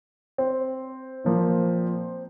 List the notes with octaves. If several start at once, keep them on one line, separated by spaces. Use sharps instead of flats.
C4
A#2 F3 A#3